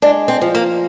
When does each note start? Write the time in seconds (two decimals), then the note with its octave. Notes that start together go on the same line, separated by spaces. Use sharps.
0.02 G#3 D4
0.28 C4
0.41 F3
0.55 A#3